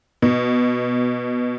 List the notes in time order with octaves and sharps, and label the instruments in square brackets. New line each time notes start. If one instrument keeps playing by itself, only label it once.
[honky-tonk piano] B2